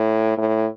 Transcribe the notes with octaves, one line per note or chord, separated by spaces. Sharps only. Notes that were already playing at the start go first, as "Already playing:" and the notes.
Already playing: A2
A2